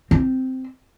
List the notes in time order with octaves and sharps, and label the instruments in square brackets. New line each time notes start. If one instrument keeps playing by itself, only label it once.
[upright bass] C4